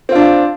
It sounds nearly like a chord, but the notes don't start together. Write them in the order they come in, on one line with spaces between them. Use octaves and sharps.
C4 F4 D4